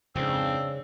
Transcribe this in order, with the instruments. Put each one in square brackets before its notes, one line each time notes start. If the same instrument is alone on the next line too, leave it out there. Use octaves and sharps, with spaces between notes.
[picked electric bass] F2 G#2 [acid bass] C#3 [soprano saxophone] C4 [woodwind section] D4 E6